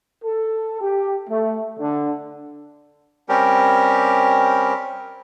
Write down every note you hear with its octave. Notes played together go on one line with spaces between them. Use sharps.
A4
G4
A3
D3
G3 C4 C#4 G4 A#4